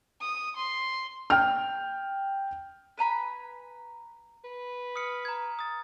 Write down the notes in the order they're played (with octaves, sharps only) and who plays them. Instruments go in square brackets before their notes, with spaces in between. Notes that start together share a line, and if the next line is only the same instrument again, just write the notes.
[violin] D#6
C6
[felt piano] G5 F6
[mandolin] B4 G#5 A#5 B5
[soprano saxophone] B4
[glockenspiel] D#6 F6 C#7
A#5 G#6
D#6 A6